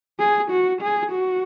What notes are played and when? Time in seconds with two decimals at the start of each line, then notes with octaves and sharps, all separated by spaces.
0.19 G#4
0.51 F#4
0.81 G#4
1.12 F#4